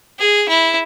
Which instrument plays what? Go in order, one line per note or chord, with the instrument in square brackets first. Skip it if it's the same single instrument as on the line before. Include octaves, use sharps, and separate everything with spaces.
[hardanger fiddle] G#4
E4